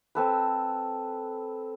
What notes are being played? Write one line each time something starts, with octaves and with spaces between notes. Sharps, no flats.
C4 A4 B4